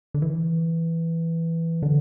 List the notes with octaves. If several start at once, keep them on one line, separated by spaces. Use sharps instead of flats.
D3
E3
D3